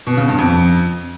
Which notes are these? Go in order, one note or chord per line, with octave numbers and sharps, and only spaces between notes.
B2
C#3
G2
F2